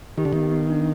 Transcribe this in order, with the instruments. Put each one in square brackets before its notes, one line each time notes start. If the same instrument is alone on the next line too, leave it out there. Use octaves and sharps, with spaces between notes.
[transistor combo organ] D#3 [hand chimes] G4
[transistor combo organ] D3
[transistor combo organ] D#3 [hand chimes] B3
[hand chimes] B3
D4